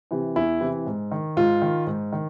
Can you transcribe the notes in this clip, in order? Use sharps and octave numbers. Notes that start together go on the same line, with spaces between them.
C3 E3
E2 E4
C3 E3
G#2
D#3
G#2 F4
D#3
G#2
D#3